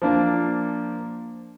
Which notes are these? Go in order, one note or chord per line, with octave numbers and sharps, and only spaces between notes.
F3 A#3 D4